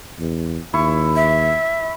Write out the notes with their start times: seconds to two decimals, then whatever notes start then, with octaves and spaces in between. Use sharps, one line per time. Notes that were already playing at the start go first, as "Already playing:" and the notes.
0.19 E2
0.74 D#2 E4 C#6
1.16 E5